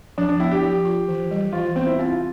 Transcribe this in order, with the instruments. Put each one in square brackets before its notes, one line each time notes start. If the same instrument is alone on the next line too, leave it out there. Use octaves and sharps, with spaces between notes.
[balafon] F3 [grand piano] D4
[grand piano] D4
[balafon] B3 [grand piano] E4
[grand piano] G4
[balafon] F3
F4
E3
G3
[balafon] E3 [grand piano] F4
[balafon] B3 [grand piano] C4
[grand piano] E4
[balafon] C4 [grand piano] F4
[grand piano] F4